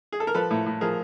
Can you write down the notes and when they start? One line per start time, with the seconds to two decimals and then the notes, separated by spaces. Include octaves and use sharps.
0.12 G#4
0.20 A4
0.27 A#4
0.34 F3 A4 B4
0.50 A2
0.66 A2
0.81 F3 G#4 A#4